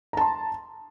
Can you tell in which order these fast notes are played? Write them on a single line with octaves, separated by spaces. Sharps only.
A#5 A5 C6